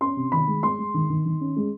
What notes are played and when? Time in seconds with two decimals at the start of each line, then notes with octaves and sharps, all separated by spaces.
0.01 C#4 C6
0.16 C3
0.32 D#3 B5
0.47 G#3
0.63 G#3 C6
0.79 G#3
0.94 D#3
1.10 D#3
1.25 D#3
1.41 C#4
1.56 G#3